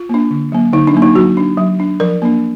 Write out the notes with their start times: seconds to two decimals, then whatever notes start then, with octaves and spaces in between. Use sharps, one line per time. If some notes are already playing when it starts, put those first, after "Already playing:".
Already playing: F4
0.09 A#3 D4
0.31 D3
0.52 F#3 A#3
0.73 D3 D#4
0.87 D4
0.94 F#3 A#3
1.02 D#4
1.15 F#3 F#4
1.37 D4
1.57 F#3
1.80 D4
2.00 F3 A#4
2.22 A#3 D4